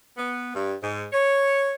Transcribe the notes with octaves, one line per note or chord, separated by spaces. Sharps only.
B3
G2
G#2
C#5